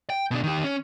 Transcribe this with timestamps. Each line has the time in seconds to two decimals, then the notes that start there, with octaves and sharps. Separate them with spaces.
0.10 G5
0.31 B2 D4
0.44 D#3 G4
0.64 C#4